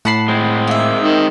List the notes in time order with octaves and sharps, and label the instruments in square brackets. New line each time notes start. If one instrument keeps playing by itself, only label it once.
[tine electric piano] A2 B5 C7 [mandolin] F#5 A5
[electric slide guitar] G#3 C4
[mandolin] A#3 E5
[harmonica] D#3